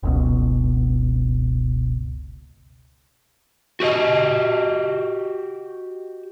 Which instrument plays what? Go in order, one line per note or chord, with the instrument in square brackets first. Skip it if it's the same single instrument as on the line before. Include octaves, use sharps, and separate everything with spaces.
[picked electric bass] F#1 C#2 B2
[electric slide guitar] F#4 G4 D5 D#5